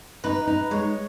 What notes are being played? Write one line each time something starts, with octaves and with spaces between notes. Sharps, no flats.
D#4 B4
D#4
G#3 C#5